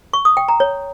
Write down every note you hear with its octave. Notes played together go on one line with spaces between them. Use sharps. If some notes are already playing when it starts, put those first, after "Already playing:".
C#6
D#6
G5
A#5
C#5